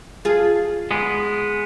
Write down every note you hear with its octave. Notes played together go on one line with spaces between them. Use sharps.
F4 G#4
G#3 B3